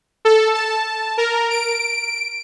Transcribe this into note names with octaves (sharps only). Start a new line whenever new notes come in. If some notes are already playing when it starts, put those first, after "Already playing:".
A4
A5
A#4
D7